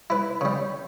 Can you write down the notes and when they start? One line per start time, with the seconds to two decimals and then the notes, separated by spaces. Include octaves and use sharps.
0.10 E4 B4
0.41 C#3 G3